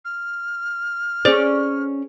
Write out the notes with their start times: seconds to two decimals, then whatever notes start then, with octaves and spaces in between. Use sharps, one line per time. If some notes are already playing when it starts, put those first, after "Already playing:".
0.05 F6
1.25 C#4 G#4 C5 D5